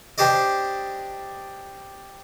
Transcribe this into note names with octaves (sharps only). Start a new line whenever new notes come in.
D4 G4 C5 D5 D#5